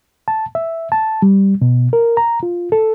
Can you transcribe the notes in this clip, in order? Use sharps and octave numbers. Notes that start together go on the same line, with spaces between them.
A5
E5
A5
G3
B2
A#4
A#5
F4
A4